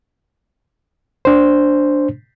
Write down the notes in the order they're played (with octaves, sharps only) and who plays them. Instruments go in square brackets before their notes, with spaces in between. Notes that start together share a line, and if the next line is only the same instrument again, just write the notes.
[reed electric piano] D4 C5